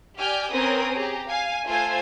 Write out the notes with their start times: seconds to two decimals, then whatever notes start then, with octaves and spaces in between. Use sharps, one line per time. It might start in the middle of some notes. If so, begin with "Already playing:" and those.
0.17 G4 D5 G5 G#5 F6
0.52 C4 C#4 A#4 B4 G#5 D#6
0.95 G4 G#4 A#5
1.28 F5 G#5
1.66 A3 F4 C5 G#5 G#6